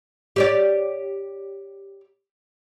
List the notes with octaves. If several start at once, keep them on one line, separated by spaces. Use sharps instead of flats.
G4 C#5 D5